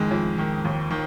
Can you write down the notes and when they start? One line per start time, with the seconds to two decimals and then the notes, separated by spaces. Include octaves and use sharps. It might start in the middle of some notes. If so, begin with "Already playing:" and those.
Already playing: F2 D#3 G#3
0.11 F2
0.38 D#3
0.65 D#2
0.91 D#3